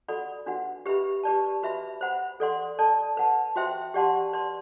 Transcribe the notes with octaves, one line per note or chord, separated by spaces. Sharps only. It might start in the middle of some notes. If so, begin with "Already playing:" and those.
F#4 A4 D5 F#5 B5
D4 F#4 B4 F#5
G4 B4 E5 B5
G4 B4 D5 A5
F#4 B4 E5 B5
C5 F#5 B5
A4 D5 F#5 C6
A4 D5 A5
B4 F#5 A5
F#4 C5 E5 G5 C6
G4 D5 F#5 A5 C6
B4 D5 A5 C6